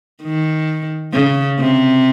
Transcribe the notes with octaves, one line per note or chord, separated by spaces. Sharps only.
D#3
C#3
C3